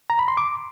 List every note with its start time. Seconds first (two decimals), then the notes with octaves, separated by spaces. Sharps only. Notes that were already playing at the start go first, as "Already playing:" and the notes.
0.10 A#5
0.19 B5
0.28 C6
0.37 D6